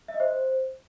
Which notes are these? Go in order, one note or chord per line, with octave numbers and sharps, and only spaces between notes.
E5
D#5
C5